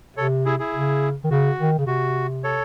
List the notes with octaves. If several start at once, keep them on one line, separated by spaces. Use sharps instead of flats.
C3 A4 C#5
E4 G#4
E4 G#4
C#3
D#3
C#3 F#4
D#3
C#3
C3 F#4
A4 C#5